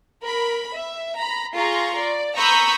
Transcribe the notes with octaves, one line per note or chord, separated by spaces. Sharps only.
A#4 B5
E5
A#5 B5
F4 G#4 A#5 C6 C#6
D5
A#5 B5 C#6 D#6 E6 G6